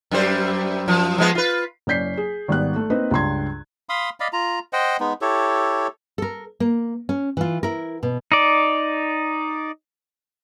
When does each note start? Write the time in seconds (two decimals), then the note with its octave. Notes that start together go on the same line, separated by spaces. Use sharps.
0.11 F#2 G3 C5
0.88 F#2 F3
1.18 F3 G#3 B3
1.35 F4 B4
1.87 F#1 C#4 D5 G6 B6 C7
2.17 G#4
2.48 G#1 G3 B3 F#6
2.76 A3
2.90 A#3 C4 D#4 B4 C5
3.11 C#2 G2 C6 G#6
3.89 F5 B5 C6 D#6
4.20 D5 D#5 F5 B5
4.33 F4 A#5
4.73 C5 D#5 F#5 G5
5.00 G#3 B3 D#4
5.21 E4 G4 A4 C#5
6.18 A4 A#4
6.60 A#3
7.09 C#4
7.37 E3 F4
7.63 E4 A#4
8.03 B2
8.32 D#4 D5